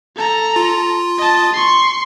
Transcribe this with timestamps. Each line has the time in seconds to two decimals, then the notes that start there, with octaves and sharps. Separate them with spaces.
0.16 A4 A#5
0.56 F4
1.18 D#5 A5
1.53 C6 C#6